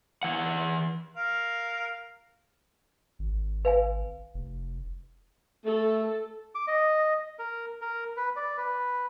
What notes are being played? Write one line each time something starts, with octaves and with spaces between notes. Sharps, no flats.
E3 F#5
A#4 F5
G#1
B4 F5 G#5
F1
A3 A4
D6
D#5
A#4
A#4
B4
D5
B4